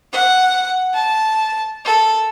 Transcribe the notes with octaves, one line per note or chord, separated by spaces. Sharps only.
F#5
A5
A4